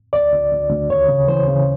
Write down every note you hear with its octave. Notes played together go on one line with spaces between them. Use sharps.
D2 D5
D2
D2
D2
D#2 C#5
C#3
E3 C5
C#3